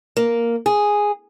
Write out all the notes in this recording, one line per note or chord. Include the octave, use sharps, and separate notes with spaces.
A#3
G#4